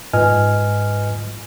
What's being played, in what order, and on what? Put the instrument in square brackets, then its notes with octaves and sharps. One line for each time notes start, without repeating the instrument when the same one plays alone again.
[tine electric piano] G#2 F4 B4 D#5 G#5 F6